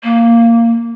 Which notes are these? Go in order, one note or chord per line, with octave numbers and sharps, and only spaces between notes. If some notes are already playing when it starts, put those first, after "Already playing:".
A#3